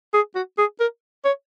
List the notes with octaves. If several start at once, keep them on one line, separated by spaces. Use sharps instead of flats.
G#4
F#4
G#4
A#4
C#5